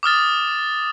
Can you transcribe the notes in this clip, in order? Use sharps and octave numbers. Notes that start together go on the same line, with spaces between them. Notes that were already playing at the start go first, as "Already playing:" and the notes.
D6 D#6 F6 A6